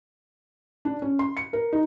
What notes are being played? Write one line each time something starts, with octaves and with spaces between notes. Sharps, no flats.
D4
C#4
C6
C#7
A#4
D#4